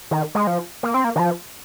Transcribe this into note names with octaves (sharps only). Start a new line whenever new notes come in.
D#3
G#3
F3
A#3
C4
A#3
D#3
F3